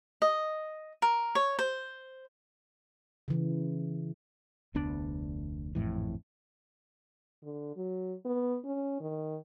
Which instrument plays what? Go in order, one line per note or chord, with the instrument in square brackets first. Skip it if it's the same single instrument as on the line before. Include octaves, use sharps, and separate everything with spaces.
[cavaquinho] D#5
A#4
C#5
C5
[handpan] C#3 E3
[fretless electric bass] F1 D2 B3 D4
G#1 F2 A2 E3
[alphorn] D3
F#3
B3
C#4
D#3